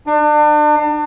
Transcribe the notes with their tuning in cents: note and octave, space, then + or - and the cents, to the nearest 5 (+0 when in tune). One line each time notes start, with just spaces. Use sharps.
D4 +35